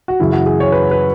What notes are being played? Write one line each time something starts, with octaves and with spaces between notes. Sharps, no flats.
F#4
F#2 C#3 E3 E4
F#4
G#4
C#5
B4
B4